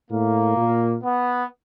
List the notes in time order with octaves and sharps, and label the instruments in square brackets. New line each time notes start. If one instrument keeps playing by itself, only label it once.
[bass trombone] A2 [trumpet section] A#3
[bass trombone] A#2
[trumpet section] B3